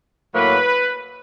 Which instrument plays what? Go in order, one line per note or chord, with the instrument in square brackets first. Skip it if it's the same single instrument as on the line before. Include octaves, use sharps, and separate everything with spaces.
[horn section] A2 F#3 A#3 B4